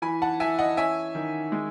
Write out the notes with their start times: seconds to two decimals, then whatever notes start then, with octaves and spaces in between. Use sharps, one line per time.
0.02 E3 G#5 B5
0.22 F#5 A5
0.40 E3 E5 G#5
0.59 D#5 F#5
0.77 C#4 E5 G#5
1.15 D#3
1.52 G#3